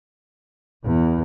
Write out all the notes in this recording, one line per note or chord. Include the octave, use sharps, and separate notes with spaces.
E2